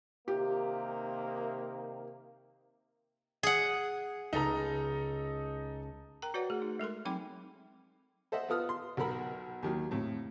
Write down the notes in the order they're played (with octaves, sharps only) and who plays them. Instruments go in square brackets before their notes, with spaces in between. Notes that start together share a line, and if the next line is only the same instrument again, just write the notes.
[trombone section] C3 D#3 A#3 [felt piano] G4
[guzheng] G#4 F#5
[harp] C#2 B4 [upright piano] D#4 A4 A#5
[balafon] A#4 G5 A#5
F#4 B4 C#5 D5 F#5
A3 G#4
D#4
G#3 A4 A#4 C6
F#3 C4 D#4 G5 B5 D6
[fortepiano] A4 C5 D#5 E5 F#5
B3 F4 A4 B4 D#6 F6
C6
B1 A4 A#4 B5
D#2 D#3 F#3
F2 A2